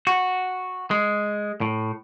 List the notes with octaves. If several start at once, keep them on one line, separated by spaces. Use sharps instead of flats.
F#4
G#3
A2